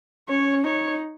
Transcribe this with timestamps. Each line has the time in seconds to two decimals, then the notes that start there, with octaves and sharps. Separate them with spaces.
0.29 C#4 C#5
0.64 D#4 C#5